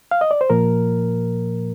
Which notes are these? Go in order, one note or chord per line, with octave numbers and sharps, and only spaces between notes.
F5
D#5
D5
C5
A#2 F3 A#3 A#4